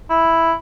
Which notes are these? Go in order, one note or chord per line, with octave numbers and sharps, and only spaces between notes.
E4